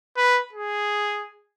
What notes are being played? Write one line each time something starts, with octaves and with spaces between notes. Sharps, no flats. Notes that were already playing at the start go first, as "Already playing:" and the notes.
B4
G#4